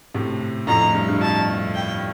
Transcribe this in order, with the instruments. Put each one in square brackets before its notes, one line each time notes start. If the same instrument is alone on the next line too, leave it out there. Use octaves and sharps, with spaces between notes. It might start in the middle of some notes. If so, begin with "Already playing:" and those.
[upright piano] A2 C3
[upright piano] F2 A2 [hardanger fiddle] A#5
[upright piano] G2
G2
[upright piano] F2 [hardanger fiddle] A5
[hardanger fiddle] G5